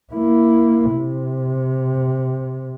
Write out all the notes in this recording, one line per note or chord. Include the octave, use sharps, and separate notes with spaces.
A#3 E4
C3